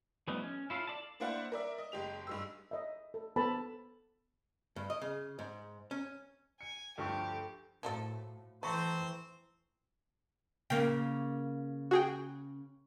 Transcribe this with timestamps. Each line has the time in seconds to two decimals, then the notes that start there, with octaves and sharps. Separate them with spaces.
0.28 F3 G3 A3 B3 D#4
0.42 C#4
0.70 E4 F4 A4 F5
0.87 A4 D5 A5
1.20 A#3 D4 E4 C5 F5 F#5
1.52 A#4 D5 E5
1.78 D#5
1.92 F#1 G#3 G4 F7
2.27 G2 G#3 E6
2.71 D#5 E5
3.14 A4
3.36 B3 A4 C5 A5 B5
4.76 G2
4.90 D#5
5.02 C#3
5.39 G#2
5.91 C#4
6.61 G#5 C#7
6.98 D2 G2 F3 G4 A4 C#6
7.83 A2 F3 F#3 A4
8.63 E3 A3 C4 C5 A5 A#5 C#6
10.70 C#3 A#3 G5
11.91 F#4 G#4 G5